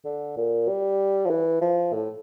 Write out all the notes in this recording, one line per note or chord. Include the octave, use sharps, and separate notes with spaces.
D3
A#2
G3
F3
E3
F3
A2